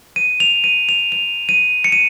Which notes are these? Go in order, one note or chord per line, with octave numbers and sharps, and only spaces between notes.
D#7
F7
D#7
F7
F7
D#7
C#7
D#7